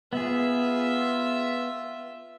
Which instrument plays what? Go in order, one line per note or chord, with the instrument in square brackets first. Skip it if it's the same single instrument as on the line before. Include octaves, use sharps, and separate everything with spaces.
[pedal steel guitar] B3 G#4 [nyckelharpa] F4 E5